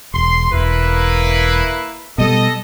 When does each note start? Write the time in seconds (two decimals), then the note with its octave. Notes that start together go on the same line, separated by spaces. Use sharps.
0.14 E1 C6
0.52 E1 A#3 E4 B4
2.18 B2 G3 A4 D#5